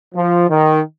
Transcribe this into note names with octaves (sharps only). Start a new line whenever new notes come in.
F3
D#3